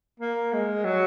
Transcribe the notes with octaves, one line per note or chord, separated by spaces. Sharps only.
A#3
G#3
F#3